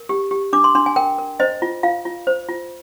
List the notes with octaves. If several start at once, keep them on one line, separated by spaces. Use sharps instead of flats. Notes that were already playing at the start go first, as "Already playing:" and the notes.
Already playing: A#4
G4
G4
D4 D6
C6
D4 C6
G#5
A#4 G5
A#4
C5 D#5
F4
F4 F5
F4
C5
F4